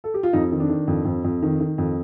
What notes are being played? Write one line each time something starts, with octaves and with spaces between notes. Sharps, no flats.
A4
G4
F4
F2 D#4
D#3
D4
D#3
F2
F2
F2
D#3
D#3
F2